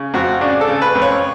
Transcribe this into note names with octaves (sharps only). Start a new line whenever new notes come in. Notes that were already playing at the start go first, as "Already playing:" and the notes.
Already playing: C#3
F2 F#4
C#3 D4
A4
C#3
B4
F2
C#5